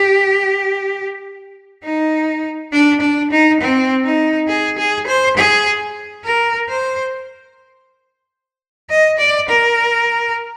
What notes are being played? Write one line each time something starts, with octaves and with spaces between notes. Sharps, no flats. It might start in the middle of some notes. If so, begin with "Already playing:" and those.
Already playing: G4
D#4
D4
D4
D#4
C4
D#4
G#4
G#4
C5
G#4
A#4
C5
D#5
D5
A#4